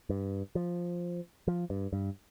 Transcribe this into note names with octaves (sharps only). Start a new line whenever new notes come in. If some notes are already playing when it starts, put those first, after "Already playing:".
G2
F3
F3
G2
G2